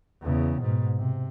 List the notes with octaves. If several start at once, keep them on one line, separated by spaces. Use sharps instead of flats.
E2 C#3
G#2 B2
C3